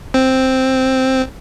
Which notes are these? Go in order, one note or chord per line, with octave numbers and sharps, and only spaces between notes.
C4